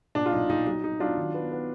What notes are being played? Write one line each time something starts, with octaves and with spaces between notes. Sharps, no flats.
A#2 D4
F4
B1 D#4
A#2 D#4
F#3 D#4
F#3 D#4
F#3 D4 F4
D#3
B3
B3